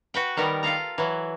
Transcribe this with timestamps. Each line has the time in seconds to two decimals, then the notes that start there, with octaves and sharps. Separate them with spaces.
0.14 F#4 B4 G5
0.37 D#3 G3 B3 A#4
0.63 F4 A4 F5 A#5
0.98 E3 F#3